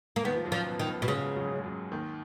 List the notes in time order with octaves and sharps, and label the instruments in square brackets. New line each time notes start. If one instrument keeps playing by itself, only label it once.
[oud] A#3
[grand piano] D#2 D#3 [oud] B3
[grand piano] F3
F#2 F#3
[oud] F3
[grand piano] B2 B3
[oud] D#3
[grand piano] B2 B3
[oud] B2
[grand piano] G#2 G#3 [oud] C#3
[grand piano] F#2 F#3
G#3
F#2 F#3
D#2 D#3